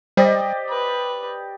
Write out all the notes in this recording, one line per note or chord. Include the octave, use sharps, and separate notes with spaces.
G3 G4 C5 D5 D#5
B4